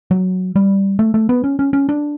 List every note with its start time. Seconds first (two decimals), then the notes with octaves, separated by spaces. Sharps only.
0.11 F#3
0.56 G3
0.99 A3
1.14 A3
1.29 B3
1.44 C#4
1.59 C#4
1.73 C#4
1.89 D4